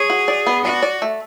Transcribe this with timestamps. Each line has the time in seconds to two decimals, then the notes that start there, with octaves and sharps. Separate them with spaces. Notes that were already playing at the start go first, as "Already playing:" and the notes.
Already playing: G#4 C#5
0.10 F#4
0.28 D5
0.47 B3
0.64 D4 F#4
0.83 D5
1.02 A3